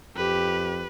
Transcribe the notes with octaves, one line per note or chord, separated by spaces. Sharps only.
F2 G4 B4